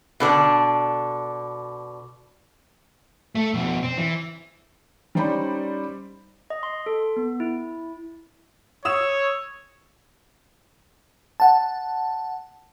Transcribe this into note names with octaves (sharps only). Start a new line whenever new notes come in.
B2 D3 D4
A3
F2 B2
C4
E3
G3 C#4 D#4 C5 D5 B5
D#5
C6
A4
B3
E4
C#5 D#6 E6 E7
F#5 A5